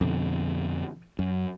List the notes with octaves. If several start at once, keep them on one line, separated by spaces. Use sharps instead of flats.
F2 B2 D3
F#2